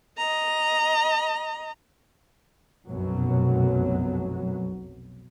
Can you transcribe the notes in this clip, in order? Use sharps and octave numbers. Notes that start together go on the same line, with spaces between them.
D#5 A#5
F1 B1 F#2 B2 F#3